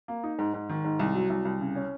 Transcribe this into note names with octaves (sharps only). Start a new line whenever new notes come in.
A#3
D#4
G#2
G#2
D#3
G#2
C2
F#3
C2
C2
C#3
C#4